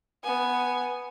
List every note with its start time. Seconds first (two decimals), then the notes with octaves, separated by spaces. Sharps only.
0.24 B3 G#5